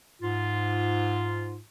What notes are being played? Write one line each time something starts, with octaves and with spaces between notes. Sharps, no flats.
G#2 F4